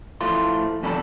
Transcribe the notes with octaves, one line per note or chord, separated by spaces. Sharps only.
A2 F3 A3 F4 C6
F2 C3 G3 A4 A#5 B5